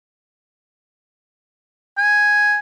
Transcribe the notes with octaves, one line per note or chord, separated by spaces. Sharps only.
G#5